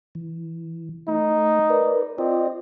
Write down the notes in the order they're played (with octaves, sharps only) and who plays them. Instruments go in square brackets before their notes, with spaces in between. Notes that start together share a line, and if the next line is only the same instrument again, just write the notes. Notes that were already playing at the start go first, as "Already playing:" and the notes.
[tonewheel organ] E3
[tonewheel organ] A3 [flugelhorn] D#4
[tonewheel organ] A#4 B4 D5
[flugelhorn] C4 [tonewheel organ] F4 D5 D#5